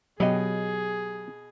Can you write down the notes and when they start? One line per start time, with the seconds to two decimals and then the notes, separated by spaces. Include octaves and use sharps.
0.20 B2 F#3 G4 G#4 D#5